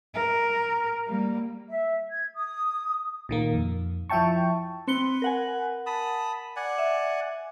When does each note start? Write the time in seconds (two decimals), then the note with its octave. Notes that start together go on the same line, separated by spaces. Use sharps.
0.14 A#4
1.07 G3 A#3
1.69 E5
2.09 G#6
2.33 D#6
3.29 A#2 D#3 A#3
3.53 F2
4.10 F3 E4 E5 G5 A5 C#6
4.88 C4 B4 C#7 G7
5.22 A#4 F#5 G#5
5.86 A5 B5 D#6
6.56 D5 F#5 G#5
6.78 E5